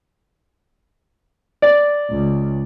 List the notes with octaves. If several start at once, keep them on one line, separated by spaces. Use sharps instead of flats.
D5
C#2